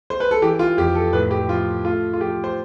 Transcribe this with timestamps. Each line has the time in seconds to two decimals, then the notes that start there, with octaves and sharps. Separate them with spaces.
0.10 C5
0.20 B4
0.31 A4
0.42 E3 G4
0.59 F4
0.78 F2 G4
0.95 A4
1.13 A2 B4
1.31 G4
1.49 F3 F4
1.84 A3 F4
2.13 F4
2.20 F3 G4
2.44 C5